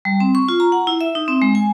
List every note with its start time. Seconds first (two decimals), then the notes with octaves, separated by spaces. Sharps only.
0.05 G3
0.20 C4
0.35 C#6
0.48 F4
0.60 A#5
0.72 F#5
0.87 E4
1.01 E5
1.15 D#4
1.28 C4
1.42 G#3
1.55 G#5